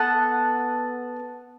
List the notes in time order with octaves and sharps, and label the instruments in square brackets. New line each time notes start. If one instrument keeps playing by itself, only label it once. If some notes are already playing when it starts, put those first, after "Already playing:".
Already playing: [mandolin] B3 A4 F#5 A5